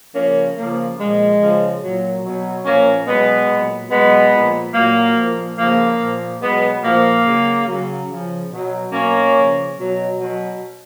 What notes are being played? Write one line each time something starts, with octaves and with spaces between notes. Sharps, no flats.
C#3 F3 A#3 C#4
C#3 F3 A#3
A#2 F3 G#3
C#3 F3
A#2 F#3
B2 F#3
A#2 F3 A#3 C#4
B2 F#3 G#3 B3
A#2 F#3
B2 F#3 G#3 B3
A#2 F3
A#2 F#3 A#3
A#2 F3
C#3 F3 A#3
A#2 F3
B2 F#3 G#3 B3
A#2 F3 A#3
C#3 F#3
C#3 F#3
C#3 F3
B2 F#3
B2 F#3 A#3 C#4
C#3 F3
B2 F#3
B2 F#3